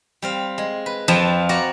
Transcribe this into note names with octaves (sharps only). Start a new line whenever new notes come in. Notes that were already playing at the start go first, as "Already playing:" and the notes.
G3 C4 F5
G#3
B4
F2 F3 F4 A5 B5
F#4 D5 A#5